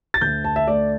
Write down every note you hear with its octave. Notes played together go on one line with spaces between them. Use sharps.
A6
D2 G6
A5
E5
A3 D5